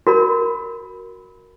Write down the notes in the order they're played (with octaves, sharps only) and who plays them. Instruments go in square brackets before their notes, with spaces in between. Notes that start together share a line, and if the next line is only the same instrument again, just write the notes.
[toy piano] F#4 A#4 B5